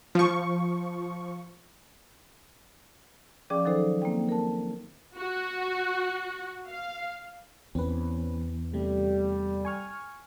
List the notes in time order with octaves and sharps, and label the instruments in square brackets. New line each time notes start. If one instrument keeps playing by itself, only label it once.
[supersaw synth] F3 C#6
[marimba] F3 C#4 G#4 D5 G5 D6
D#3 F#3 D#4 A4 C5
A#3 C4 G5
A#4 A5
[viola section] F#4
F5
[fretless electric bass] E2 [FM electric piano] C4 C#4 B4
[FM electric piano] C3 A3 [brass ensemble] G3
[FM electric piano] G#5 C#6 F6